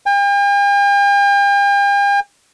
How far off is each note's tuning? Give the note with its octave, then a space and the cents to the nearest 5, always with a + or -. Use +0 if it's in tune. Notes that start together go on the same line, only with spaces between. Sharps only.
G5 +45